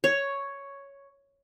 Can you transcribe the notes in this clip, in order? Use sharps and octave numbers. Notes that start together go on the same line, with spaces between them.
C#5